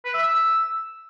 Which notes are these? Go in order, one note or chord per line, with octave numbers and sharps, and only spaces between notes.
B4
E5
E6